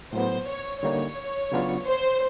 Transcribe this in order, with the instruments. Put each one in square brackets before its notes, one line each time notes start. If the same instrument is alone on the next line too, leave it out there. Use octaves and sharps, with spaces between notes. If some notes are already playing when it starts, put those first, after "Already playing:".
[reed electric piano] A2 F#3 B3 [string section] C5
[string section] C#5
[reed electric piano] D3 G3 A#3 D#4 [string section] C#5
[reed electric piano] C#3 F#3 B3 D4 F4
[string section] C5